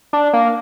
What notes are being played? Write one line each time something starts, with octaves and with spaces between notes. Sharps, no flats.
D4
A#3